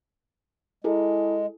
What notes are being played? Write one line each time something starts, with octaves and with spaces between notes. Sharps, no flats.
G#3 E4 G#4 A4